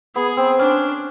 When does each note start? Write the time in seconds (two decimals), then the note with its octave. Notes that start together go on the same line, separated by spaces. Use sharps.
0.16 B3 G#4
0.37 C4
0.59 C#4 D4